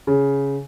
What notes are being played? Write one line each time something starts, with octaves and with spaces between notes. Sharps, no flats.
C#3